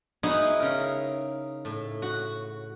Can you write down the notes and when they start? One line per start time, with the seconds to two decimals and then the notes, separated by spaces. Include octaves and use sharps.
0.23 G#3 B3 D#4 E4 F#4 G#4
0.60 C#3 A#4
1.65 A2
2.02 F#4